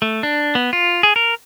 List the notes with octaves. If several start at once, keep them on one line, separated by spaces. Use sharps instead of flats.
A3
D4
B3
F4
G#4
A#4